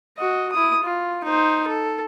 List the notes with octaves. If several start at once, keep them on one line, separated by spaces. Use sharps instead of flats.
F#4 D#5
E4 D#6
F4
D#4 C5
A4